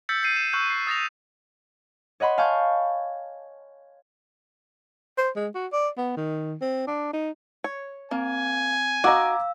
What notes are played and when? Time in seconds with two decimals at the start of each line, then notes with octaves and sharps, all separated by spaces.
0.09 E6 G6 A6 B6 C#7
0.23 G6 C7 D#7
0.36 E7
0.53 C#6 E6 F#6 G6
0.70 C7
0.87 D#6 A6 A#6 F7
2.20 C#5 D#5 F#5 B5 C6
2.38 F5 G#5 A5 C#6 G6
5.18 C5
5.36 G#3
5.55 F#4
5.73 D5
5.97 B3
6.17 D#3
6.61 C4
6.87 D4
7.13 D#4
7.64 C#5
8.11 A#3 C4 G#5
9.04 F#4 D#5 F5 A#5 D6 E6